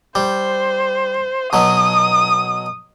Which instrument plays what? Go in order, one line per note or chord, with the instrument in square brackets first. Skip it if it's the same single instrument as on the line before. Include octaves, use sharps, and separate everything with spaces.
[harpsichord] G3 [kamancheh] C5
[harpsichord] B2 F#3 [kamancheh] D#6